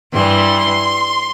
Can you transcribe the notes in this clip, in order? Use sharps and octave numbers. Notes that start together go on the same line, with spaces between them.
G2 E3 G3 C6